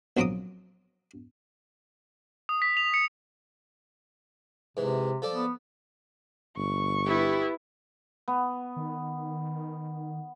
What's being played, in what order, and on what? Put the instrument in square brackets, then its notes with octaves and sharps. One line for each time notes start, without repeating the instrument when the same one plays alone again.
[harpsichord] A#1 F#3 C4 A#5 D6 D#6
[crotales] D#6
B6
F7
C#7
[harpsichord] G#2 E3 [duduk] C3
[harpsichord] F3 A4 D5
[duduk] B3
[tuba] G1 [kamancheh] C#6
[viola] B3 E4 [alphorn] G4
[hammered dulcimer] B3
[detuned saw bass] D#3